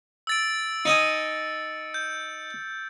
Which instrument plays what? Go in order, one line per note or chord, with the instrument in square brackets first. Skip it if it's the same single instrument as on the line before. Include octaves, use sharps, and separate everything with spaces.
[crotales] E6 A6 D7
[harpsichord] D#4 D#5 G#5 [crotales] C#7
[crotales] G6